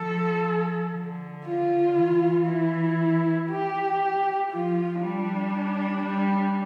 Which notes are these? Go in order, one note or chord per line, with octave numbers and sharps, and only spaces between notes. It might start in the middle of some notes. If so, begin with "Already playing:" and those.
Already playing: F3 A4
D3
F4
E3
E4
G4
F3 F4
G3 D4
G3